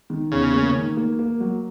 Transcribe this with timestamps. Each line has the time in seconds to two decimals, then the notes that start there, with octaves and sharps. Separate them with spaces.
0.10 D#3
0.32 E2 C#3
0.54 A#3
0.75 D#3
0.97 A#3
1.19 A#3
1.40 F#3